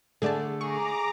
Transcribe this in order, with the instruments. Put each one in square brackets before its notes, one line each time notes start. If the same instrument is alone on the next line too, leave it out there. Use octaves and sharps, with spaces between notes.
[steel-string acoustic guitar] D3 A3 [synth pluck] G#4 D5 A5
[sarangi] G#4 [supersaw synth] A#5 D6 [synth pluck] C#6